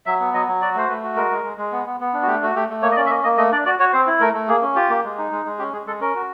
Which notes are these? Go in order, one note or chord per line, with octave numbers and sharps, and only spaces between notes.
F#3 E5
B3
F#3 D#5
F#3
F#4 D5
A3 C5
A3 B4
F#4
G#3 A#4
G#3
G#3
G#3
B3
B3
B3
D4
F#4
A3 G4
A3 F#4
A3 G4
A3
A#3 C#5
D#5
C#4 D5
E5
A#3 D#5
A#3 D#5
A3 D#5
D4 D5
F#4 D5
F#4 C#5
C4 C5
E4
A3 A#4
A3
A#3 G#4
C#4
F4 G4
A#3
G#3
D#4
G#3
G#3
C#4 G4
G#3 G#4
G#3 A4
C#4 A#4
F#4